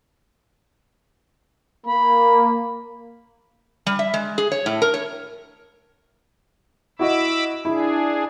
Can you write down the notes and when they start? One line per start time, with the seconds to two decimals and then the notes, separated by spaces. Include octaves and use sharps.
1.87 A#3 B5
3.86 G3
3.99 E5
4.14 G#3
4.38 G#4
4.52 C#5
4.66 A2
4.82 A#4
4.94 C#5
6.99 E4 F#4 D#5 B5 D6 E6
7.65 D4 E4 G#4